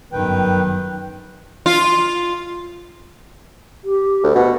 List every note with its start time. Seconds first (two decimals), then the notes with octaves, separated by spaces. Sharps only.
0.13 G1 F#2 D#3 B4 G5
1.66 F4
3.84 G4
4.23 D2
4.35 B2 F#5